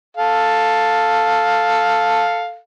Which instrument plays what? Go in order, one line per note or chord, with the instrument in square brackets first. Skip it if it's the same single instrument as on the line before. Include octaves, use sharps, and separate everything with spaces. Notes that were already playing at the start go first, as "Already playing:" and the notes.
[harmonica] A4 F5